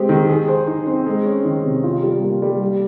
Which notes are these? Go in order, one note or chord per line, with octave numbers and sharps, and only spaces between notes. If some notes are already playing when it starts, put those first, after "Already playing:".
Already playing: G#3 C4 G4
D#3
G#4
C5
D#4
C4
G#3
C#4
D#3
C3
F4
G3
A#3
G3
G4